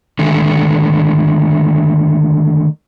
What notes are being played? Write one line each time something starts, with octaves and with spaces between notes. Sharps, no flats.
D3 D#3 G#3 A3